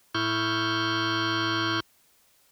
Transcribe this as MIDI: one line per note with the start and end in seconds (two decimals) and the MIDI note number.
0.15 1.80 45
0.15 1.80 64
0.15 1.80 85
0.15 1.80 89
0.15 1.80 91